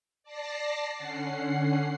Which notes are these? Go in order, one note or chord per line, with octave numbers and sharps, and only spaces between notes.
D5 A5 A#6 C7
D3 C#4 F#5 C7